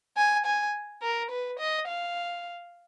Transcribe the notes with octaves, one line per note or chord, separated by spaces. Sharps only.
G#5
G#5
A#4
B4
D#5
F5